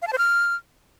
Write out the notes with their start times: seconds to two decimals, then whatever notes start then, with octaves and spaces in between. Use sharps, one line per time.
0.02 F5
0.07 A5
0.13 C5
0.18 F6